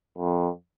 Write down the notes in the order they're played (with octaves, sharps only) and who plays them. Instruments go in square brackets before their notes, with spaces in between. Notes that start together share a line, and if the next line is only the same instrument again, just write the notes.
[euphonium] F2